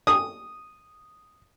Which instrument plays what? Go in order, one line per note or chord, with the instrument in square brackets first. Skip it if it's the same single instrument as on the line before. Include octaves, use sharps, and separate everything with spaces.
[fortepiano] D#6